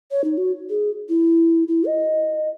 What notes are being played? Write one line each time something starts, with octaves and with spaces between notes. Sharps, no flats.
C#5
D#4
F#4
G#4
E4
E4
D#5